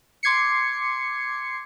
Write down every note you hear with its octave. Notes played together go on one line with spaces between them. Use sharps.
C6 D6 G#6 C7 C#7